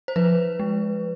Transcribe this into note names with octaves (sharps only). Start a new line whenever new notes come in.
C5
F3 B4
G#3